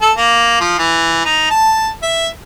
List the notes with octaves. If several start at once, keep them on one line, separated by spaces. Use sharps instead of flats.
A4
A#3
F3
E3
D#4
A5
E5